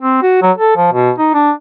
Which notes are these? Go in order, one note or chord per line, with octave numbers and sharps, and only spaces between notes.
C4
F#4
F#3
A4
F3
B2
D#4
D4